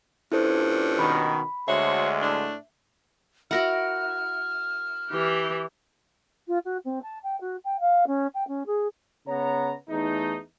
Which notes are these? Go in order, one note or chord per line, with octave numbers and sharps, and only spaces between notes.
G2 A#2 C#4 E4 A4 C5
B2 D#3 B5
D2 D3 G#3 F#4 C5 C#5 E5
A2 A3 D4
E4 F#4 A#4 F#5 F6
E3 G4
F4
F#4
C4
A5
G5
F#4
G5
F5
C#4
G5
C#4
G#4
C#3 B3 C#5 A#5
E2 A3 D#4